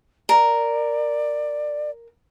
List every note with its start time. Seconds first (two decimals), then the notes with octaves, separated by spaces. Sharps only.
0.29 A#4 D5